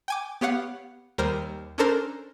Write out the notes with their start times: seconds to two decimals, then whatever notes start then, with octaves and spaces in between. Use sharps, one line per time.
0.08 G5 G#5 D6
0.41 B3 G4 C#5 F5 F#5
1.18 D#2 G3 A#4 C5 F6
1.78 C#4 D4 A4 A#4 C5